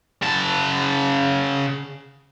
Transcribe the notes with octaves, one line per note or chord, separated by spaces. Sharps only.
C#3 A5